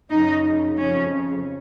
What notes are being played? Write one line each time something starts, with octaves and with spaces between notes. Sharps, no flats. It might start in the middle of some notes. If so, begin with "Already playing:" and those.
F#2 C#3 D#4
F2 C#3 C#4